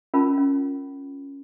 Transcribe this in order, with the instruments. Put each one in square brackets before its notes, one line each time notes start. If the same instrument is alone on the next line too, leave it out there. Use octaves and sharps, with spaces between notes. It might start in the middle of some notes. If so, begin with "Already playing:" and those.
[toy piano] C#4 F4 A#4 A5 B5
C#4